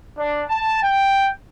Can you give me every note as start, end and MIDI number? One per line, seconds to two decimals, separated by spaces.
0.18 0.43 62
0.48 0.78 81
0.82 1.28 79